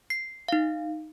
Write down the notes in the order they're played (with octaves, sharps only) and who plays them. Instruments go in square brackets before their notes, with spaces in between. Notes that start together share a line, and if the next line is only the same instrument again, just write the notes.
[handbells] C7
D#4 F5